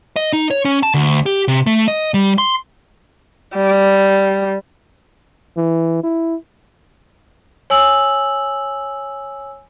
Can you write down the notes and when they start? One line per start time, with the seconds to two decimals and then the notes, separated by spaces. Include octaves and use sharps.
0.16 D#5
0.33 D#4
0.50 C#5
0.65 C#4
0.83 A5
0.94 D2
1.26 G4
1.48 C3
1.66 A3
1.88 D#5
2.14 G3
2.38 C6
3.55 G3
5.57 E3
6.03 E4
7.70 C#5 G#5 E6 F#7